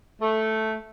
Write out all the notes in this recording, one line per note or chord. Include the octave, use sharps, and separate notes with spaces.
A3